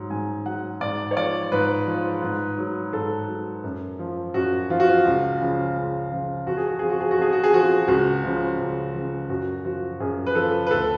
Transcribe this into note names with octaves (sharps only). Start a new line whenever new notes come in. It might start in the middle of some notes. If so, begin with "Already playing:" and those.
Already playing: G#2 F#3
G#2 G#5
F#3 F#5
G#2 D5
C#5
F3 D5
G#2 B4
F3
G#2
F#3
G#2 A4
F#3
F#2
F3
F#2 F#4
F3 F4
F#4
F4
C#2
C#3 F3
C#2
C#3 F3
F2 F#4
G#4
F#4
F3 G#4
F#4
G#4
F#4
F2 G#4
F#4
G#4
F3 F#4
C#2 F#4
C#3 F3
C#2
C#3 F3
F#2 F#4
F3 F#4
F#2 G#4
B4
F3 A4
B4
D2 A4